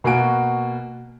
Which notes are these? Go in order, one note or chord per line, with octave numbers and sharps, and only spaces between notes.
B2 A#3 F#4 G#5 D7